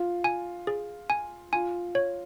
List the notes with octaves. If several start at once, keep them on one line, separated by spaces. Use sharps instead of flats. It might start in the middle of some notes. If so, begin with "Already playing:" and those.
Already playing: F4
G#5
G#4
G#5
F4 G#5
C#5